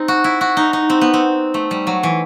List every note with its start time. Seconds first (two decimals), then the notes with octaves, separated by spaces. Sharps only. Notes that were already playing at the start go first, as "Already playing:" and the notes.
Already playing: C4 D#4
0.08 F#4
0.24 E4
0.41 F#4
0.57 D#4
0.73 D#4
0.90 C4
1.01 B3
1.14 C4
1.54 A3
1.71 G3
1.87 F#3
2.03 E3